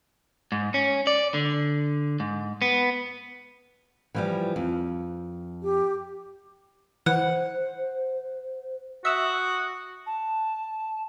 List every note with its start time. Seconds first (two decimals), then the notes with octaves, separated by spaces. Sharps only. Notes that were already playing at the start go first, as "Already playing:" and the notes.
0.52 G#2
0.74 C#4
1.07 D5
1.34 D3
2.20 G#2
2.62 B3
4.15 E3 F3 G3
4.56 F2
5.63 G4
7.06 E3 C5 F#5
9.05 F#4 E5 D#6 E6
10.06 A5